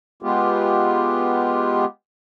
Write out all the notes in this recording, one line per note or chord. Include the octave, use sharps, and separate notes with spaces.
G#3 B3 F4 G4